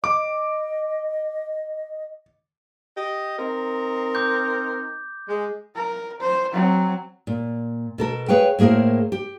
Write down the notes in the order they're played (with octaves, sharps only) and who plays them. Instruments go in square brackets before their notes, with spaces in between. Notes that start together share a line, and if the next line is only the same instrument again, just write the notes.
[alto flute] D#5 [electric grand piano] D6
[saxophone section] G4 D#5
C4 D#4 A#4
[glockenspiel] D6 G6
[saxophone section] G#3
[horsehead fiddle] A#4
C5
F#3 C4
[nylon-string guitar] A#2
B2 A4 A#4
G#4 B4 C#5 F5 G5
A2 A#3 G#4 A#4 C5
G4